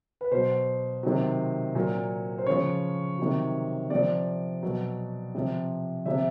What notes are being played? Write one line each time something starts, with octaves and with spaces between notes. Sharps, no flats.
B4
B2 F#3 C5
C3 D#3 F#3
A#2 F#3
C5
C#3 F3 C#5
C3 D#3 F#3
C3 F3 D5
B2 F#3
C3 F3
C3 F3 E5